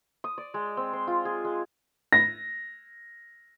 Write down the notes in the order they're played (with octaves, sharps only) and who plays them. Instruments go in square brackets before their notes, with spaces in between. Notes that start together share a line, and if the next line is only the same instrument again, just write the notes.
[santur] D#6
D5
G#3
C4
C5
F4
G#4
G#3
[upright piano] A#6